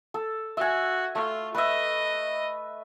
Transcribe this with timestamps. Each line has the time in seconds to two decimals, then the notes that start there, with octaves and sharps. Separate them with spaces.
0.14 A4
0.57 F#4 E5 G#5
1.15 A3 F4
1.55 B4 D#5 E5